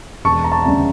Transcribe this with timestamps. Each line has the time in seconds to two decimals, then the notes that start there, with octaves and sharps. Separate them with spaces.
0.25 E1 A5 C#6
0.44 A#5
0.52 A5 C#6
0.65 D2 C#3 G3